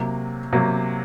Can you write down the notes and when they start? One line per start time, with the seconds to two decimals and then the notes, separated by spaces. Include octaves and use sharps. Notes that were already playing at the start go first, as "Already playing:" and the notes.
Already playing: C3 F#3 A#3
0.53 C3 F#3 A#3